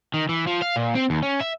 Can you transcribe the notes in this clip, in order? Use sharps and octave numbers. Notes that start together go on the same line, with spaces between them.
D#3
E3
F3
F5
A#2
C4
D#2
C#4
E5